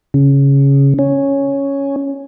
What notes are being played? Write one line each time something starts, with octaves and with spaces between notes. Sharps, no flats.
C#3
C#4